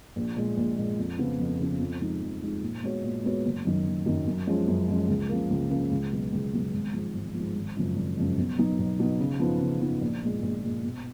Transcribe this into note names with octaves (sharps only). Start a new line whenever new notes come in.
A#1
A#2 G#3
A#1
A#2 G#3
F2
C#3 F3 B3 F4
F2
C#3 F3 B3 F4
F2
F3 G#3 D#4
F2
F3 G#3 D#4
A#2
G#3 B3 F#4 C#5
A#2
G#3 B3 F#4 C#5
F#1
F#2 D#3 F#3
F#1
F#2 D#3 F#3
F#2
F3 G#3 C#4
F#2
F3 G#3 C#4
C#2
C#3 F3 A#3
C#2
C#3 F3 A#3
C#2
B2 F#3 B3
C#2
B2 F#3 B3
G#1
G#2 F3
G#1
F3
G#2
G#1
F#2 C#3 F3 G#3
G#1
F#2 C#3 F3 G#3
B1
B2 F#3 B3 D#4
B1
B2 F#3 B3 D#4
C#3
F3 B3 D#4
C#3
F3 B3 D#4
A#1
A#2 G#3
A#1
A#2 G#3
B2